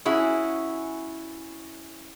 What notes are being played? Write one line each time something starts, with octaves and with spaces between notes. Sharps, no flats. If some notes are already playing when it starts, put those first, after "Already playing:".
C#4 E4 F#4 G#4